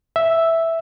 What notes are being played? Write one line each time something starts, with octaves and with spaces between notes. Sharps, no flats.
E5